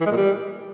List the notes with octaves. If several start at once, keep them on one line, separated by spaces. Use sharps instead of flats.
E3
G#3
A#2
G3